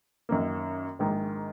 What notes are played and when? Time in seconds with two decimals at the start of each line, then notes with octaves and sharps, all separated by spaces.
0.29 F#2 D#3 A#3
0.99 A#1 G#2 D#3 G#3